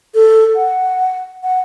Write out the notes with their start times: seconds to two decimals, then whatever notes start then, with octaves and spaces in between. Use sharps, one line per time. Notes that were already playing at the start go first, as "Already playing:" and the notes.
0.14 A4
0.55 F#5
1.43 F#5